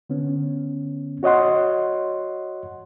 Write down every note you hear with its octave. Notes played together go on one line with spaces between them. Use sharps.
D3 B3 C#4
F#4 C#5 D#5 F#5 C6